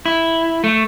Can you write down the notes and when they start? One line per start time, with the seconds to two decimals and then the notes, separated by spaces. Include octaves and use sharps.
0.06 E4
0.64 A3